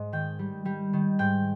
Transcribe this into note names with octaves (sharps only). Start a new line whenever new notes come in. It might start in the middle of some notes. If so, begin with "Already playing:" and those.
Already playing: G#2 D#5
D#3 G5
G3
G3
D#3
G#2 G5